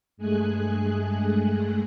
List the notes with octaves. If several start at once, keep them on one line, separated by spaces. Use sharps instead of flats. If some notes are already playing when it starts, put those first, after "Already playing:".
G2 G#3 A3 G#4 G#5 F#6